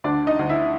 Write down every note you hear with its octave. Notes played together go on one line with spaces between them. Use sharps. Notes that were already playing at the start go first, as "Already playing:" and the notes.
D2 D4 D5
D#4 D#5
D2
E4 E5